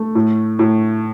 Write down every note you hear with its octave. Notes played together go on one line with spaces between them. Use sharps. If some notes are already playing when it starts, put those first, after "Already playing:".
Already playing: A3
A2
A2